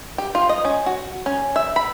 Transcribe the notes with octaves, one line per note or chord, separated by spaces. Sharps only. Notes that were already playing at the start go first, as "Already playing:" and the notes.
G4
F4
D#5
C#4
F#4
C#4
E5
B5